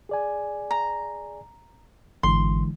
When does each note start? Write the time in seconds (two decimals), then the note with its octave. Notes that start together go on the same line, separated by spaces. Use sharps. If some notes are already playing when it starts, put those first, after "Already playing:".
0.09 G#4 D5 G#5
0.71 A#5
2.23 G#1 D3 E3 G#3 C6